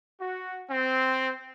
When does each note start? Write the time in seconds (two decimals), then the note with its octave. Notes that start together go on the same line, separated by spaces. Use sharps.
0.21 F#4
0.69 C4